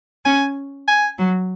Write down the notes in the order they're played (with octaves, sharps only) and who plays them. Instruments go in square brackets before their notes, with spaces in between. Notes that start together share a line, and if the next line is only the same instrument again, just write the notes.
[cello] C#4 [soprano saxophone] G#5
[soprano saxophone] G#5
[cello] F#3